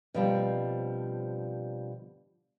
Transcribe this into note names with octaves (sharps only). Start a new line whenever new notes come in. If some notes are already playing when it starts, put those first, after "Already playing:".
B2 D3 F3 G3 A#3 C4